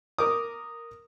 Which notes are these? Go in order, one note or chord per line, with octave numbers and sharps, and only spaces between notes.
A#4 D6 D#6